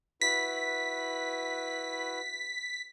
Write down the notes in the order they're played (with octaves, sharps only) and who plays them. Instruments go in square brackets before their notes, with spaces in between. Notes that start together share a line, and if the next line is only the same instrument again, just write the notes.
[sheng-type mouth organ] E4 F#4 B4 [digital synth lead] B6